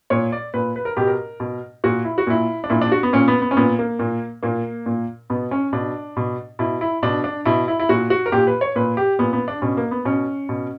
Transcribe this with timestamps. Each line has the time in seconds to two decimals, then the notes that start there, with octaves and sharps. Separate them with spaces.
0.10 A#2 C#5
0.32 D5
0.54 A#2 B4
0.76 B4
0.85 A#4
0.97 B2 G4
1.07 A#4
1.40 B2
1.84 A#2 F#4
2.05 E4
2.18 F#4
2.27 A#2 E4
2.64 D4
2.70 A#2 E4
2.81 D4
2.92 F#4
3.03 B3
3.13 A#2 C#4
3.28 B3
3.42 B3
3.51 C#4
3.57 A#2 B3
3.79 A#3
3.99 A#2
4.43 A#2 A#3
4.86 A#2
5.30 B2 B3
5.51 C#4
5.73 B2 D4
6.17 B2
6.59 B2 E4
6.81 E4
7.03 B2 D4
7.24 D4
7.45 B2 E4
7.68 E4
7.80 E4
7.89 A#2 F#4
8.10 F#4
8.26 A#4
8.32 A#2 G4
8.47 B4
8.61 C#5
8.76 A#2 B4
8.97 G4
9.19 A#2 B3
9.33 B3
9.48 D4
9.62 B2 C#4
9.77 A#3
9.91 B3
10.05 B2 C#4
10.49 B2